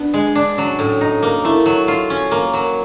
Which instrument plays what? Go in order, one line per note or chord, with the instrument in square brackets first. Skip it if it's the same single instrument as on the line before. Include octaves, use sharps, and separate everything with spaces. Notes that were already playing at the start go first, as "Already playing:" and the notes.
Already playing: [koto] B3 [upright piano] D4
[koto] G#3
D4
[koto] F#3 [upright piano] C#4
[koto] A2
D#4
A#3
[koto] A3 [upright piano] E4
[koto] F#3
F4
C#4
A#3
F#3